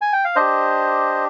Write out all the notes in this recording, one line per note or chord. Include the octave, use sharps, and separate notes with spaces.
G#5
G5
F5
D4 G4 C5 D#5